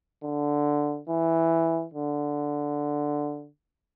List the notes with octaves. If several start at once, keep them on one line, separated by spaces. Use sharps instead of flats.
D3
E3
D3